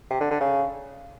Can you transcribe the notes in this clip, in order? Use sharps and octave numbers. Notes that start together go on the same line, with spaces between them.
C3
D3
D3
C#3